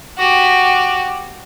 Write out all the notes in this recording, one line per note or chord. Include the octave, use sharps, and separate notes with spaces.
F#4 G4